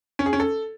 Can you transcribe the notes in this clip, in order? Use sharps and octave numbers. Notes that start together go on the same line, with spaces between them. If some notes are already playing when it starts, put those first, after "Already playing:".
C#4
G#4
C#4
A4